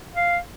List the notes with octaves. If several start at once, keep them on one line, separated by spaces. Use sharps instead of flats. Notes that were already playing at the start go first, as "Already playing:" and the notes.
F5